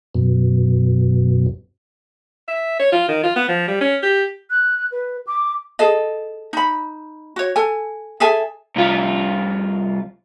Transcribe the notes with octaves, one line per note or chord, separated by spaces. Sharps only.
F#2 B2
E5
C#5
F4
D#3
F4
B3
F3
G3
C#4
G4
F#6
B4
D6
G#4 A4 D#5
D#4 B5
F#4 C#5
A4 G#5
G#4 A4 E5 G#5
C2 F4